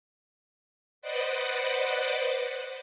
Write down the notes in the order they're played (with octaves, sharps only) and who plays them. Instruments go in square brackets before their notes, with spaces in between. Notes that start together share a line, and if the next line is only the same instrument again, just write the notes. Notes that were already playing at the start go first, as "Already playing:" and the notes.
[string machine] B4 C5 D5 D#5 F#5 D6